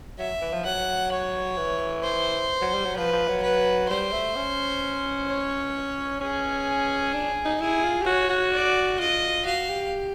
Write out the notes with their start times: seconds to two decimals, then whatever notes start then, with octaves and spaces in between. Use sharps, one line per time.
0.19 F#3 E5
0.41 E3
0.53 F3
0.65 F#3 F#5
1.12 C#5
1.57 E3
2.04 C5
2.61 F#3
2.74 G3
2.85 F#3
2.96 F3 B4
3.12 F3
3.28 F#3
3.43 B4
3.89 G3 C5
4.13 A3
4.36 C#4
5.28 C#5
6.21 C#4 G#4
7.14 D4
7.45 D#4
7.60 E4 G#4
7.84 F4
8.02 G4
8.06 F#4 C#5
8.30 F#4
8.52 D5
8.99 F4 D#5
9.45 F#4 F5
9.69 G4